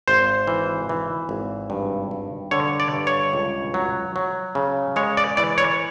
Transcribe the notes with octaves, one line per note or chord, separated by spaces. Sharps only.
G#1 C5
E3
E3
G#1
G2
G2
D3 C#5
D5
G2
C#5
C#2
F#3
F#3
C#3
G#3 C#5
D5
E3 D5
C#5